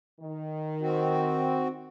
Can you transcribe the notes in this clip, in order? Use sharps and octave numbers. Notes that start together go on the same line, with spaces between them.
D#3
C4 F#4